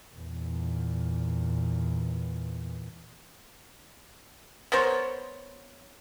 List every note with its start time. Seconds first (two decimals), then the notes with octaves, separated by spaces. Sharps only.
0.14 E2 A#2
4.72 B3 A#4 C5 C#5